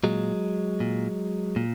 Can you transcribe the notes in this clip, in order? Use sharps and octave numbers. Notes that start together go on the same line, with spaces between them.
A#2 F#3 G#3
A#2
A#2